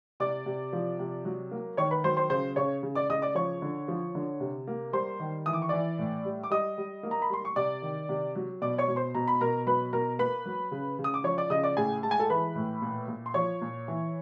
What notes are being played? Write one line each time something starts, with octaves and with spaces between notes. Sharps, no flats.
C3 D5 D6
C3
F3
C3
F#3
A#3
D#3 C#5 C#6
B4 B5
F#3 C5 C6
C5 C6
C#3 C5 C6
C#3 C#5 C#6
C#3
D5 D6
C#3 D#5 D#6
D5 D6
F3 C#5 C#6
D3
F3
D3
C3
A#3
G3 C5 C6
D#3
E3 D#6
D6
C#6
E3 D5 D6
A2
G3
D6
G3 D#5 D#6
G3
A#3
A#5
B5
G3 C6
C#6
C3 D5 D6
D#3
C3
F#3
B2 D5 D6
C#5 C#6
B2
C5 C6
B2 A#5
B5
B2 A#4 A#5
F#3 B4 B5
B2 A#4 A#5
A#3 B4 B5
F#3
C#3
C#3
D#6
D6
F3 C#5 C#6
D5 D6
C#3 D#5 D#6
D5 D6
A2 G#4 G#5
G#3 A5
G#5
A4 A5
E3 B4 B5
A2
A#2
A#2
C6
F3 C#5 C#6
A#2
E3